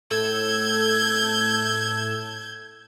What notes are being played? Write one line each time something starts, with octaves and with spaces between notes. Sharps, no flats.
A2 A4 E6 G6 G#6